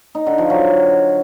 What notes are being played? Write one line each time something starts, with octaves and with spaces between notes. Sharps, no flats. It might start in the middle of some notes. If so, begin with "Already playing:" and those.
D#4
D3
F3
F#3